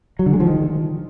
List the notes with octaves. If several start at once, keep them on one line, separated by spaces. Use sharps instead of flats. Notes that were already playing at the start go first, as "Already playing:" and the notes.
F#3
D3
G#3
F3
D#3